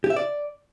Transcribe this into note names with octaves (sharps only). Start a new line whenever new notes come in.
G4
E5
D5